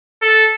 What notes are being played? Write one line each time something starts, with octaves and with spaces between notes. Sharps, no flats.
A4